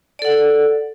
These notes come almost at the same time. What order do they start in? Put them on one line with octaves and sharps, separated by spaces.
D5 A4 F#5